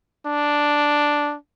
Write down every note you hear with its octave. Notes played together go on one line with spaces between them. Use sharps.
D4